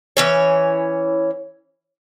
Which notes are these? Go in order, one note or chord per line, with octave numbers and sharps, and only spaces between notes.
E3 C#4 C#5